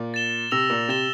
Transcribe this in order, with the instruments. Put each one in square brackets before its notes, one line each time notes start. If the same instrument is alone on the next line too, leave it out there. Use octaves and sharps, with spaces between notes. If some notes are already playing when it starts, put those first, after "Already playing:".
Already playing: [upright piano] A#2
[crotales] A6 E7 G7
[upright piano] C3 [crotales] E6 A#6 F7
[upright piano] A#2
[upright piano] C3 [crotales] A6 E7 G7